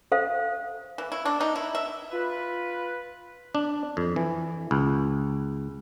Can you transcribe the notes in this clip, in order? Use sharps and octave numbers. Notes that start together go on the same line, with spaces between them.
A4 C5 F5
E3
E4
D4
D#4
E4
E5
F4 B4
D4
F2
E3
C#2